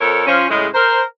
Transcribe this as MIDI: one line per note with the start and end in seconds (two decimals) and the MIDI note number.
0.01 0.25 41
0.01 0.25 69
0.01 0.25 70
0.01 0.25 73
0.27 0.46 53
0.27 0.46 61
0.50 0.68 45
0.50 0.68 49
0.50 0.68 56
0.74 1.02 70
0.74 1.02 72